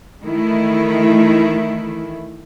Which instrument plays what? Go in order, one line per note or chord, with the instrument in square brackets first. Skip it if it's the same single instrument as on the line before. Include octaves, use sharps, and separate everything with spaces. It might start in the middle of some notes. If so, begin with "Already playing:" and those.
[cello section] D#3 E3 A3 E4